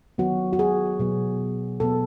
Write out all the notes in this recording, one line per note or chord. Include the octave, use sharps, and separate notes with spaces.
D#3 F#3 B3 F#4
F#4
G#4
B2 F#3 B3
B2 F#3 B3 A4